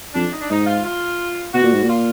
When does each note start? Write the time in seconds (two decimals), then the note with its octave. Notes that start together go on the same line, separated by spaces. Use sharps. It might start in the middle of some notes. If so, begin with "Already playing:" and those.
0.14 F2 D4
0.32 D#4
0.41 D4
0.50 G#2 D#4
0.67 F4
0.84 F4
1.53 B2 F#4
1.64 A#2
1.73 G#2
1.82 A#2
1.89 F4